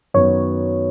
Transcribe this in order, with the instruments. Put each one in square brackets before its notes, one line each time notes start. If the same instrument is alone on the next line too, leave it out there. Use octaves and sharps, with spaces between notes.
[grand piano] F#2 D#3 F#3 B3 [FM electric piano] C#5